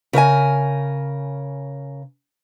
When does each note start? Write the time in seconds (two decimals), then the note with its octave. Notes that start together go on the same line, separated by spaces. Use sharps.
0.13 C#3 A#4 E5 G#5